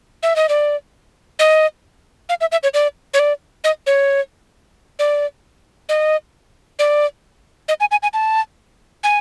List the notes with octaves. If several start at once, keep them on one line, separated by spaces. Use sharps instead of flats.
E5
D#5
D5
D#5
F5
E5
E5
C#5
D5
C#5
D5
D#5
C#5
D5
D#5
D5
D#5
G#5
G#5
G#5
A5
G#5